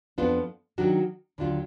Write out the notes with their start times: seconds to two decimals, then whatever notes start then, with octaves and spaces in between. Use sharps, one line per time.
0.18 F2 F3 B3 D4 F4
0.78 D#3 F#3 D4 F#4
1.38 D#2 D3 F#3 D4 F4